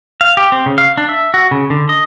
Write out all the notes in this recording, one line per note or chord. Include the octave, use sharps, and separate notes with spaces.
F5
G4
C4
C#3
F5
D4
E5
F#4
C#3
D3
D#5